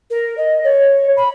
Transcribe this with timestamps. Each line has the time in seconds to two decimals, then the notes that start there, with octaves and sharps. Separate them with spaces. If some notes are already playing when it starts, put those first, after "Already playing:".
0.10 A#4
0.38 D#5
0.64 C#5
1.17 B5